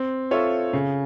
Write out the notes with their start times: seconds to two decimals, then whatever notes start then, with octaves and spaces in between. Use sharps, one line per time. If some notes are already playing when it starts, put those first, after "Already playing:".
Already playing: C4
0.31 F4 A4 C#5 E5
0.73 C#3